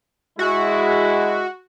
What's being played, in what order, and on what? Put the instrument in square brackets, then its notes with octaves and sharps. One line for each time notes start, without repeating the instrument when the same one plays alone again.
[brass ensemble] G#3 E4 [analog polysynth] F#4